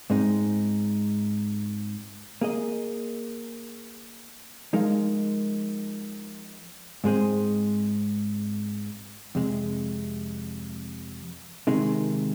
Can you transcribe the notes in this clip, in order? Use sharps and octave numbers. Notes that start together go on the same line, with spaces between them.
G#2 G#3 C4 D#4
A#3 G#4 D#5
F3 G#3 D#4 A#4 F5
G#2 G#3 C4 G#4 C5
F2 C3 G#3
C3 D#3 G#3 D#4